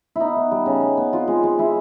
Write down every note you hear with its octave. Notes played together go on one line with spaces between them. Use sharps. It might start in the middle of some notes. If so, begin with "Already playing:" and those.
B3 D#4 E4
B3
G3
C#3
B3
B3
C4 F4
G#3
G#3
G#3 E4